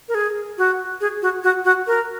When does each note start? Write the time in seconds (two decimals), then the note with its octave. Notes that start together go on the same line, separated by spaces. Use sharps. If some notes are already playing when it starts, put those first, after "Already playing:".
0.09 A#4
0.15 G#4
0.58 F#4
1.01 G#4
1.22 F#4
1.44 F#4
1.65 F#4
1.87 A#4